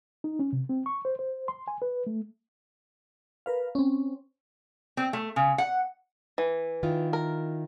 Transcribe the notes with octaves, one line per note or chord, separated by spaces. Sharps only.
D#4
C#4
C3
C4
C#6
C5
C5
C6
G#5
B4
A3
A#4 B4 F5
C4 C#4
C4
A3
C#3
F#5
E3
D#3 E4 F4
A#4